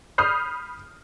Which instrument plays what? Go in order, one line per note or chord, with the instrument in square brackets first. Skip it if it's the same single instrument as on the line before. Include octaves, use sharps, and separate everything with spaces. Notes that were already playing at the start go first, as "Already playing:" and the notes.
[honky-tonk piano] B5 D#6 F6 G6 C7